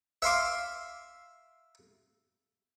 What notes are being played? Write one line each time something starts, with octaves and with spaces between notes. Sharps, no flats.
E5 F5 C6 D6